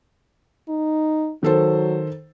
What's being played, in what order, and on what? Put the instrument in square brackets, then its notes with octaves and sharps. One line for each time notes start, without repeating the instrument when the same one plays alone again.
[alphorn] D#4
[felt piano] D#3 A4 C5 [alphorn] F#3